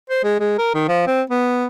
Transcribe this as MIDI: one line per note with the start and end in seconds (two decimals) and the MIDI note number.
0.10 0.21 72
0.24 0.35 56
0.40 0.53 56
0.59 0.72 70
0.74 0.86 51
0.88 1.02 53
1.07 1.22 60
1.30 1.67 59